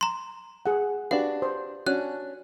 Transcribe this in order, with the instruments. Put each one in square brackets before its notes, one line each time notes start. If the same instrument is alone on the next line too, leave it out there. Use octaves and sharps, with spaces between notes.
[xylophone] A#5 C6
[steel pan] G#4 F#5
[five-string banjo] D4 F#4 [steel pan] G4 B4 [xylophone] F5
[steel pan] C5
[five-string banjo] C#4 D4 [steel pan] F#4 [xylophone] F#6